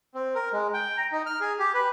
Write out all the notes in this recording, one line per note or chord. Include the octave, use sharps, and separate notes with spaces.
C4
A#4
G#3
G5
A#5
D#4
F6
G#4
G4
B4